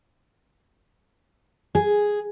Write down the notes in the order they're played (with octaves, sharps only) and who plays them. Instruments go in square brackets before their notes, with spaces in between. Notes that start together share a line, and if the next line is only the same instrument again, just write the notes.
[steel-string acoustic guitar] G#4